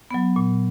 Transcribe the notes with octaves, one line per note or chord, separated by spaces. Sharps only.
F#3 B3
A#2